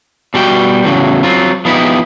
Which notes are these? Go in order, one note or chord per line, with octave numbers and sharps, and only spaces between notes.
B2 G3 F#4 G5
E2 A2 C#3 F3 F#3
F#3 C4 F4
F3 B3 D#4 E4 G4